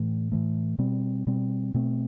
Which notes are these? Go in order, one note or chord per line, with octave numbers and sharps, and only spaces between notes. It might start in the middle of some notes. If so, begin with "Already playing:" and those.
Already playing: A2 E3 A3
A2 E3 A3
B2 G3 C4
B2 G3 C4
B2 A3 C4